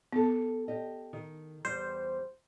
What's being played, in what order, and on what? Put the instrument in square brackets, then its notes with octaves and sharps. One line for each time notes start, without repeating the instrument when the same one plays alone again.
[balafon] B3 [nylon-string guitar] G4 A4
[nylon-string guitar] G4 D#5
D#3
[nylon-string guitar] E2 G3 [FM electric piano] C5